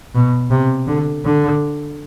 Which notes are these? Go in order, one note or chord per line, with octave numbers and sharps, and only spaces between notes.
B2
C3
D3
D3